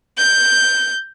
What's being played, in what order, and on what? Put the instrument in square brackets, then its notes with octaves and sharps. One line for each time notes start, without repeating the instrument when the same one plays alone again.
[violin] G6